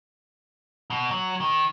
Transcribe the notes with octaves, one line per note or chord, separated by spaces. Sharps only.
B2
F#3
D#3